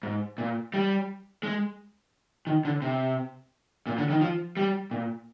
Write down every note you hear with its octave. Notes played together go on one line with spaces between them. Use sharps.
G#2
A#2
G3
G#3
D#3
D3
C3
A#2
D3
D#3
F3
G3
A#2